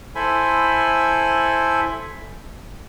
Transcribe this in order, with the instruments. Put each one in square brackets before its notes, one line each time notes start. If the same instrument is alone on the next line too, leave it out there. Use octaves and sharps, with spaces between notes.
[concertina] E4 A4 C5 G#5 B5